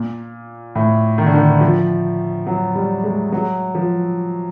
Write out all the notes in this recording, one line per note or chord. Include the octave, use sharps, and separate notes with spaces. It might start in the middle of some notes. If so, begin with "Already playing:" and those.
Already playing: A#2
A2
D#3
D3
D#3
F3
F#3
G3
G#3
F#3
F3